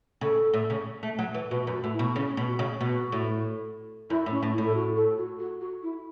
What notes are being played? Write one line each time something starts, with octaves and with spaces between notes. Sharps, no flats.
C#3 A4
A2
C#3
A3
F#3
E3
B2 F#4
F#2
F#4
A2
E4
B2
C#3 C#4
B2
F#4
C#3
B2 F#4
A2
F#2 E4
A2
C#4
A2
E4
A2
A4
F#4
A4
F#4
F#4
F#4
E4